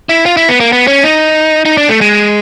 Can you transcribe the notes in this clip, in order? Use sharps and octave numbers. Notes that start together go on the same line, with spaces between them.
E4
F4
E4
B3
A#3
B3
C#4
D#4
D#4
D4
A3
G#3